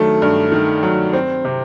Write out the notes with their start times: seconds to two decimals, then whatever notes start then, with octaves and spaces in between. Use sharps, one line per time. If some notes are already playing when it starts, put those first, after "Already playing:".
Already playing: G2 D#3 F#3 A3
0.22 G2
0.52 D#3
0.83 F#3
1.13 C4
1.45 C3